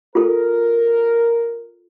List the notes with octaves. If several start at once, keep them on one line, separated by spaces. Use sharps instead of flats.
F4 A4 A#4